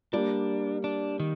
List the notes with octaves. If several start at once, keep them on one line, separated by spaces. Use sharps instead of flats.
G3 A#3 D4
D4
D#3